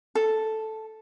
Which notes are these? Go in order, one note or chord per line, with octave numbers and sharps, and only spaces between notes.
A4